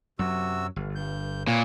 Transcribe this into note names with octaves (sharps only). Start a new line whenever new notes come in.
F#2 C3 F#3 F#4 E6
G1
G2 G6
A#2 B4 C#5